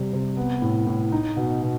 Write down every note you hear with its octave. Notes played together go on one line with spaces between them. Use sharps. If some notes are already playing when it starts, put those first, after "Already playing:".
Already playing: C3 G3
C3
B3
A2
A2
D#4
B2
B2